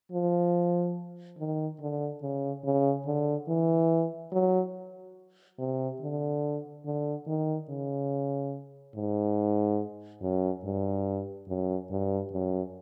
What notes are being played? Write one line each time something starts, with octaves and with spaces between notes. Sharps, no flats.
F3
D#3
D3
C#3
C#3
D3
E3
F#3
C3
D3
D3
D#3
C#3
G#2
F#2
G2
F#2
G2
F#2